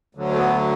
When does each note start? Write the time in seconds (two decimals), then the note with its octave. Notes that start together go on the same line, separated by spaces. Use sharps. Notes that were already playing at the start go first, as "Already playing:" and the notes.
0.15 D2 D3 F#3
0.32 A3
0.37 B3